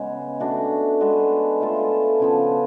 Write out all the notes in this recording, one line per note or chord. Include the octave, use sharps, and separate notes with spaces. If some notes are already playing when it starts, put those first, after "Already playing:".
Already playing: C#3 G#3 B3
A3 D4 F#4
G#3 B3 F#4 A4
A3 F4 A4
C#3 F3 B3